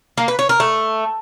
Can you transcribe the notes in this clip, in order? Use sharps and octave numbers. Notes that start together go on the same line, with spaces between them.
A#3
B4
C#5
A#4
A3